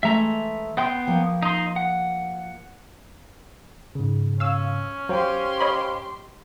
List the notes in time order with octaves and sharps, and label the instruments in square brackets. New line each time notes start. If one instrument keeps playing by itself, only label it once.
[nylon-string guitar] E3 G#3 A3 [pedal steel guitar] E5 A#5
[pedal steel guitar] B3 G5 C6 [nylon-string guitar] E5
[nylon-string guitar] F3 A#3
[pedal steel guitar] D#4 C6
F#5
[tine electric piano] G#2 C#3
[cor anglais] C#4 [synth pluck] F5 E6
[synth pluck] F#3 [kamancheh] G4 C6 [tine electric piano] C5 F5 G5
[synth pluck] C#5 D#5 B5